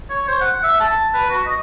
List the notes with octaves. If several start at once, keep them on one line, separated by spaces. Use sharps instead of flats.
C#5
C5
F#5
E5
A5
B4
F#4
D#5